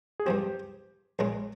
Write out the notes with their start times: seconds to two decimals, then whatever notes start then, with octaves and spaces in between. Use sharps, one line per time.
0.20 G#4
0.26 G2 F3 C4 G4
1.19 A#1 A#2 G#3 C#4 G#4